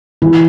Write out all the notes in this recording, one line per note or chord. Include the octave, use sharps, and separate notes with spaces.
E3 E4